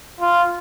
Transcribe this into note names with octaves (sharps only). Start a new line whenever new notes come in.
F4